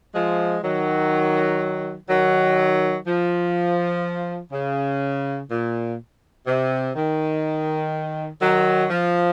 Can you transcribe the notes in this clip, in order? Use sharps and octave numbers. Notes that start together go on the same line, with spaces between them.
F3 G#3
D#3 F#3
D#3 F#3
F3
C#3
A#2
C3
D#3
D#3 F#3
F3